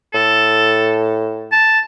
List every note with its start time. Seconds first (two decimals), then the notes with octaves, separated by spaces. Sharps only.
0.14 A2 A4
1.52 A5